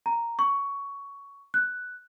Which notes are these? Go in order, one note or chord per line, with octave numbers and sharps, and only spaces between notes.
A#5
C#6
F#6